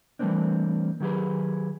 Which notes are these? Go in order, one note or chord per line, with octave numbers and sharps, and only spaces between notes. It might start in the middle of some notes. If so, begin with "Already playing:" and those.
E3 G3 A3 A#3 C4 D4
D#3 F#3 G4 G#4 B4